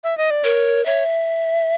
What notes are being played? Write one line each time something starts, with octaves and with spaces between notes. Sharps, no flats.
E5
D#5
D5
A#4 C#5
C#5 E5